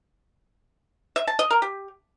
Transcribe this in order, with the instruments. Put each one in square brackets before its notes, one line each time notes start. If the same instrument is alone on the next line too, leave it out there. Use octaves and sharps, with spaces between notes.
[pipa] E5
A5
D#5
A#4
G4